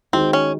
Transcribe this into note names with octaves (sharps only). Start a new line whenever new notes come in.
D#3 G#3 C4 D#4 F#4
C#4